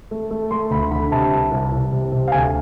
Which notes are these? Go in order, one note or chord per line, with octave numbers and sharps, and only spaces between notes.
A3
A3
A3 C6
D2 B5
D3 B5
C3 A5
C2
C2
C2
C3
C3
F5
D2 G#5